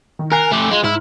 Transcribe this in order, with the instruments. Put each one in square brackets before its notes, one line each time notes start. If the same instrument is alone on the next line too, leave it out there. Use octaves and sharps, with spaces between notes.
[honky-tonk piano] D#3
[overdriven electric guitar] A#4 [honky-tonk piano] G#5 F#6 C7
[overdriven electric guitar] A3 G4
[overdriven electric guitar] G#3 [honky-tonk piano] F4
[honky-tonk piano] G#2 F6 [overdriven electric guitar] E4